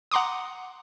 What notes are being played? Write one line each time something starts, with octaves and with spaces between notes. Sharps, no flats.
F#5 A#5 C6 D6 D#6